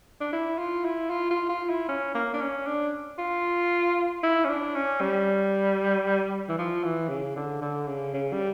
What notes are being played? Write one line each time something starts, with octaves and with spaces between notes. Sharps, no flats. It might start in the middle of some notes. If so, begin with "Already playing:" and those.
D4
E4
F4
E4
F4
F4
F4
E4
C#4
A#3
D4
C#4
D4
F4
E4
C#4
D4
C#4
G3
E3
F3
E3
C#3
D3
D3
C#3
C#3
G3